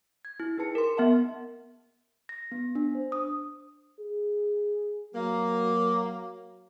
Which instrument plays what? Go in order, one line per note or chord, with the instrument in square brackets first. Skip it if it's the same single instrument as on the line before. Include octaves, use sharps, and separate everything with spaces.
[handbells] G#6
E4
D#4 G#4 B4 A5 C#7
A#4 C6
B3 E5 F#5 A5
[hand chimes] A#6
B3
D4
C5
D#6
[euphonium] G#4
[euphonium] F#3 [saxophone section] A#3